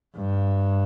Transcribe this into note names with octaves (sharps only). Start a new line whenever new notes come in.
G2